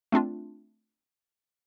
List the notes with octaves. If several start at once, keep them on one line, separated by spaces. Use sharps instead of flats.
A3 C4 D4 F4